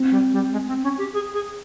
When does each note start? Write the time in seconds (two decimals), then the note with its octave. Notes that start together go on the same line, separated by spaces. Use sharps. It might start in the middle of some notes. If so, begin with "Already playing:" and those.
Already playing: C4
0.11 G3
0.33 G3
0.52 G#3
0.67 C4
0.83 C#4
0.98 G4
1.14 G#4
1.34 G#4